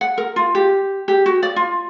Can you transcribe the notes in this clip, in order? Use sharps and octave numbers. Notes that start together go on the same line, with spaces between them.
F#5
A#4
F4
G4
G4
F#4
D5
F4